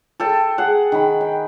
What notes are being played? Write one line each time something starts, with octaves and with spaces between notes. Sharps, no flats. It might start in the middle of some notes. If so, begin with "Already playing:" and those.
A4 G5 A5
G#4 F#5
D#3 B5
G5